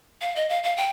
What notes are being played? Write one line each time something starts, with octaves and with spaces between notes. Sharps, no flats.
F5
D#5
F5
F5
G5